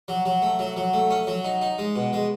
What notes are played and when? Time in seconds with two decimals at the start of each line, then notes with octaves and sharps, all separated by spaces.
0.08 F#3
0.25 F#3
0.42 A3
0.59 F#3
0.76 F#3
0.93 A3
1.10 C#4
1.27 F#3
1.44 D#4
1.62 D#4
1.78 G#3
1.96 B2
2.13 G#3